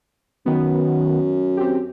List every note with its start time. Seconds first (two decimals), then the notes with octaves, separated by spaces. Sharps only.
0.46 F#2 D#3 B3
1.57 C4 G4